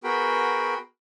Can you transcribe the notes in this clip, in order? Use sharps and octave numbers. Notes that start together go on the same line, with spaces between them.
B3 F#4 G#4 A#4 G5 B5